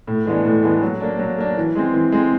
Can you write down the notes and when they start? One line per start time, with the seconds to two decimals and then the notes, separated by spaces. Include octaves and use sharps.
0.07 A2
0.26 E3 G#3 B3 D4
0.45 A2
0.63 E3 G#3 B3 D4
0.82 F#3
1.00 A#3 D4
1.19 F#3
1.38 A#3 D4
1.57 E3
1.75 G#3 C4
1.94 E3
2.12 G#3 C4